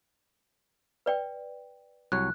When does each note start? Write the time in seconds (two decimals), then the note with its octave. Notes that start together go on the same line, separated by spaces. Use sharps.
1.06 B4 D5 G5
2.12 C2 F#3 C#5 F#6